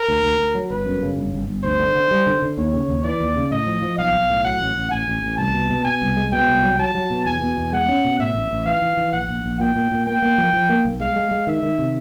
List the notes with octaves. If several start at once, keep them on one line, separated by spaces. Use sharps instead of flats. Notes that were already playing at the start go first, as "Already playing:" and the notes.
Already playing: A#4
D2
D2
D2
F#3
G1 B4
F#2
C#3
G1
G1
G1
D2 C5
D3
D3
G3
D3
D3
D#2 C#5
C#3
D#2
E3 D5
D#2
C#3
A2 D#5
F3
F3
B1 F5
B1
A2
F#3 F#5
A1
A1
A1 G#5
A1
A1
C2 A5
B2
B2
B2 G#5
C2
G#3
B2 G5
C2
F#3
F#3 A5
F#3
B2
E2 G#5
B2
E2
G#3 F#5
C#4
B2
A2 E5
A1
A1
E3 F5
E3
E3
A#1 F#5
A#1
A#1
A#2 G5
A#2
A#2
A#3 G5
A#3
F3
F3
A#3
B1
G#3 F5
G#3
G#3
D#3 E5
D#3
C3